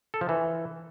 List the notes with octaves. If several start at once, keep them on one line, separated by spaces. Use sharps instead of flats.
A4
F3
E3